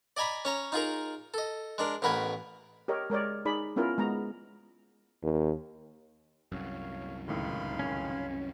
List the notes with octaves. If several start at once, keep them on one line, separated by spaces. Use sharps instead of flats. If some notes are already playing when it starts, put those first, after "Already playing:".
D5 D#5 G#5 A#5 B5
C#4 C#5 A#5
D#4 F4 G#4 A#4
A4 D#5
G#3 D4 A#4
A1 B2 A#4 B4 G#5
G4 A#4 C#5 D#5
G#3 A#4 C#5 D5
D#4 G#4 D5 B5
B3 C#4 E4 F4 A#4
G#3 B3 A#5
D#2
C2 F#2 C#5 F5
C#2 A2 D#3 F5 B5 C6
C#4